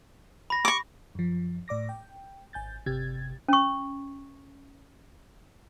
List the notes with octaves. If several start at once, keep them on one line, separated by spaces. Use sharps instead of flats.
B5 A#6
C#6 D6
F#2 F3
A2 D5 D6 A#6
G5
G#1 G#5 G6 A6
G1 C3 G4 G#6 A6
C#4 C#6